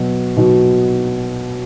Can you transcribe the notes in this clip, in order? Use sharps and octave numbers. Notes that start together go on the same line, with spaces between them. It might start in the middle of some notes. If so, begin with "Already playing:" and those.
Already playing: B2 F#3
B2 F#3